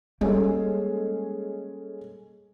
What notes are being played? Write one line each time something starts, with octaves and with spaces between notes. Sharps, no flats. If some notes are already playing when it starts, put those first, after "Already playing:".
G3 G#3 A#3 C#4 A4